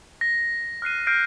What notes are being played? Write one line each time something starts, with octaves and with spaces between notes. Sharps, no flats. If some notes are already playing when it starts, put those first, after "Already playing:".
A#6
F6 F#6 C7 D#7
F6 G6 A#6 C7 D7